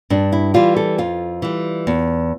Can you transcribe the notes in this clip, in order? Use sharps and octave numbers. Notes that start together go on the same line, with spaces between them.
G2 D4
E4
E3 G3 F4
A4
F2 F4
E3 G3
E2